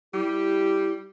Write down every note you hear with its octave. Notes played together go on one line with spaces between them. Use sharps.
G3 E4 G4